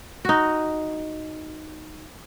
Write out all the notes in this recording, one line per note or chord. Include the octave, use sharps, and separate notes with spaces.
D#4 F#4